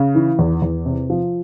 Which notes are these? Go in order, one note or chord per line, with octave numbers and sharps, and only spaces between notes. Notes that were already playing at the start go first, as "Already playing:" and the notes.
Already playing: C#3
E3
E2
E2
C3
F3